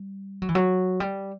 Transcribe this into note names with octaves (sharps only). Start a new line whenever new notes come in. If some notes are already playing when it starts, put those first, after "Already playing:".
Already playing: G3
F#3
E3
F#3
G3